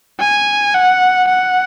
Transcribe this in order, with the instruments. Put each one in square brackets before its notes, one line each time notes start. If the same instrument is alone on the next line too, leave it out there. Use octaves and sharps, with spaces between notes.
[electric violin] G#5
F#5
F#5